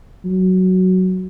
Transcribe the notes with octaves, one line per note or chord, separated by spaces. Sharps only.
F#3